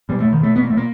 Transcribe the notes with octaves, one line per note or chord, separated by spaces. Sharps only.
B2 G3
A3
B2
D#3
B2 A3
B2 B3
A#3
B2 A3
A#3